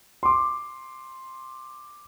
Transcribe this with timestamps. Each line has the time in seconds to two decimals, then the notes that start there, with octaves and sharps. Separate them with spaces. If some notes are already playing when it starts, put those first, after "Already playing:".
0.23 C6 D6